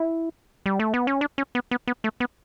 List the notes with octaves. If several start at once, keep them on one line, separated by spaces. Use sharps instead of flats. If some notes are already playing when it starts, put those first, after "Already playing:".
Already playing: E4
G3
A3
B3
C#4
D4
C#4
B3
B3
B3
A3
B3